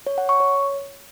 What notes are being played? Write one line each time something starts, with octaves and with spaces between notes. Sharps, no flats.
C#5
F#5
C#6
C#5